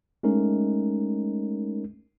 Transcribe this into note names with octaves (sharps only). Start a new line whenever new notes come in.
G#3 A3 C#4 D#4 A#4